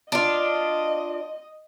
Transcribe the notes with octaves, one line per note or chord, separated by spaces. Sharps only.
D4 F4 D#5